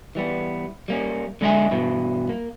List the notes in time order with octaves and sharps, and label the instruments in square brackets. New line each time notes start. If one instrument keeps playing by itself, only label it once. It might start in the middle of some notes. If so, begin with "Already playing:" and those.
[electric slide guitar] E3 G3 B3
G3 A#3 C#4
D3 G#3 D#5 E5 G#5
G2 B2 E3
A#3